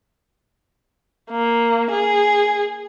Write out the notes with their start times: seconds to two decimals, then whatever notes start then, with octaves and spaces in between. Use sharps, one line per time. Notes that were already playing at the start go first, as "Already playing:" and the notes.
1.31 A#3
1.91 G#4